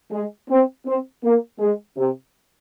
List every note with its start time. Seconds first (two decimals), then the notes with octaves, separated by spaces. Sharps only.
0.12 G#3
0.50 C4
0.86 C4
1.24 A#3
1.60 G#3
1.97 C3